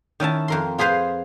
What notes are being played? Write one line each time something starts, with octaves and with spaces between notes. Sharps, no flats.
D#3 C#4 E4 A5
F2 A#4 C6
F4 G#4 B4 C5 F5